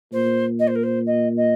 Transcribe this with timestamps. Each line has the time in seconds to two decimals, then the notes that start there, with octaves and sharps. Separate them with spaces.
0.12 A#2 C5
0.59 D#5
0.67 C5
0.75 A#4
0.83 C5
1.06 D#5
1.36 D#5